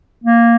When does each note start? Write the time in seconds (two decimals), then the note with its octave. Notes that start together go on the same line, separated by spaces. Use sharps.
0.24 A#3